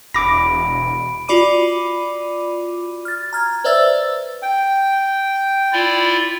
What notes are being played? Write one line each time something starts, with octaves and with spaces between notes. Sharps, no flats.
E1 B5 D6 A#6 D7
F4 F#4 D5 B5 D6 D#7
F6 A6
A#5 F6 G#6
B4 C5 D5 E5 E6 A6
G5
E4 F4 D5